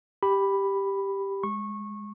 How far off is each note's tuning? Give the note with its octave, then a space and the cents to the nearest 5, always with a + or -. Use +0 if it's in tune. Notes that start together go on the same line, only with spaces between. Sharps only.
G4 +0 B5 +0
G#3 -5 C#6 -20